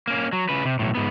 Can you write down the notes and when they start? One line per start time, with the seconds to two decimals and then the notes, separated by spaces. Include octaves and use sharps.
0.07 A#3 C#4
0.33 F#3
0.49 C#3 B4
0.65 C3
0.79 B1 A2
0.95 G#2 B3